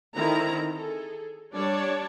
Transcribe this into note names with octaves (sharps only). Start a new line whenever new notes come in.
D3 D#3 C4 E4 A#5
G#4 A4
G3 D4 C#5 D5 A5